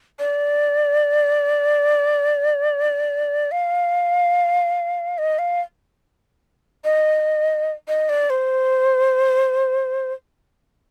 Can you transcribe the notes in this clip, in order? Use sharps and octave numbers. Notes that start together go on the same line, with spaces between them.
D5
F5
D#5
F5
D#5
D#5
D5
C5